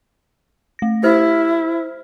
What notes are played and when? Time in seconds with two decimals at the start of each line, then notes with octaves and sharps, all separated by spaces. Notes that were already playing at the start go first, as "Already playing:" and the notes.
0.79 A3 A#6
1.03 E4 G4 C5 F6